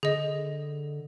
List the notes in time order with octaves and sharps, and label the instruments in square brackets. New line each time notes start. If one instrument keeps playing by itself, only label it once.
[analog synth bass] D3 [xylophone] G#4 D#5